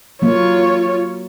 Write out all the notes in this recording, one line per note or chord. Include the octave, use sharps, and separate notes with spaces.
F#3 A#3 F4 C#5